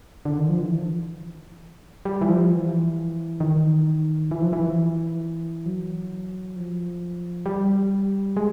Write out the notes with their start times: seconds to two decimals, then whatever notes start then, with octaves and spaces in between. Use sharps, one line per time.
0.25 D3
0.38 D#3
0.49 F3
0.59 E3
2.05 G3
2.22 E3
2.28 F3
2.51 E3
3.40 D#3
4.31 E3
4.41 F3
4.53 E3
5.66 F#3
6.56 F3
7.46 G3
8.37 G#3